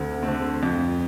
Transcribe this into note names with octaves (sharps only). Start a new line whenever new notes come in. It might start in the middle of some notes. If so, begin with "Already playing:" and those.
Already playing: D2 D3 A3 C4
D3 A3 C4
F2